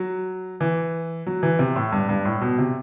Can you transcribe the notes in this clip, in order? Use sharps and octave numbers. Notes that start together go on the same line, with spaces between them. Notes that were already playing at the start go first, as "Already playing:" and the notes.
Already playing: F#3
E3
F#3
E3
C3
A2
G2
G2
A2
B2
C3